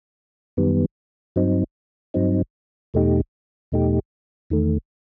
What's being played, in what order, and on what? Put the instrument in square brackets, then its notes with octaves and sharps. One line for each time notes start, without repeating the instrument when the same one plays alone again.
[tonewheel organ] F#2 D#3 G3 B3
G2 F#3 C4 D#4
G2 F#3 C4 D#4
E2 B2 A3 D#4 G4
E2 B2 A3 D#4 G4
E2 D#3 A3